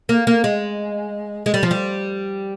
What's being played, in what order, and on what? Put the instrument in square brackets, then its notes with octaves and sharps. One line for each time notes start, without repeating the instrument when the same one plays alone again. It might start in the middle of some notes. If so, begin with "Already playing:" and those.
[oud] A#3
A#3
G#3
G#3
G3
F3
G3